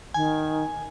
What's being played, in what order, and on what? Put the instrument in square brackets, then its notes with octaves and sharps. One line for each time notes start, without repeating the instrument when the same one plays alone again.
[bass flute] D#3 [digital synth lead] G#5